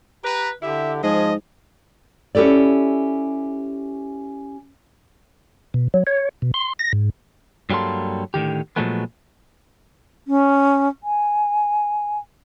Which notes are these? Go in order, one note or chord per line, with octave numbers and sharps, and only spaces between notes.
G4 B4 A#5
D3 E4 G4 E5
G#2 F3 G#3 G#4 D#5
C#4 E4 G4 A4 D5
B2
F#3
C#5
B2
C6
A#6
G#2
G2 F#3 G3 A#3 A4 C6
A2 D3 D#3 G4
A#2 F3 F#3 G#3 A3 B3
C#4
G#5